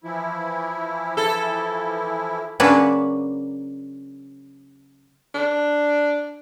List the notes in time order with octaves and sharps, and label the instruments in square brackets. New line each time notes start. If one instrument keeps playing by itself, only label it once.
[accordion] E3 F3 E4
[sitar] A4
[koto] C#3 F#3 A#3 C#4 D4 B4
[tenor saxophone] D4